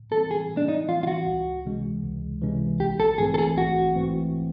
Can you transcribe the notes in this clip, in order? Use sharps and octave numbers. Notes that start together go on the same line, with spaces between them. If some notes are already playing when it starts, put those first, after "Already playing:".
Already playing: A2
E3 G3 C4 A4
G#4
A2
D4
D#4
E3 G3 C4 F4
F4
F#4
C#2
C3 E3 G#3 C#4
C#2
C3 E3 G#3 C#4
A#1 G4
A4
G#2 E3 A3 C4 G#4
A4
G#4
A#1 F#4
G#2 E3 A3 C4